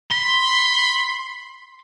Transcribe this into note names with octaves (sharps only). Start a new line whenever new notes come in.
B5 C6